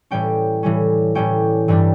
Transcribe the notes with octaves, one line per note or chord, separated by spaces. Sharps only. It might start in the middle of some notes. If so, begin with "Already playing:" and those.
A2 E3 G3 C#4 G5
A2 E3 G3 C#4
A2 E3 G3 C#4 G5
G2 E3 G3 D4